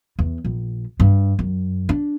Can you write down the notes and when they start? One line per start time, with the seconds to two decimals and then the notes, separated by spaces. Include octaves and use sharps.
0.19 E2
0.45 A#1
1.00 G2
1.39 F#2
1.89 D4